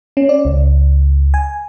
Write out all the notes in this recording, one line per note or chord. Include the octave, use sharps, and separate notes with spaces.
C#4
D5
C#2
G#5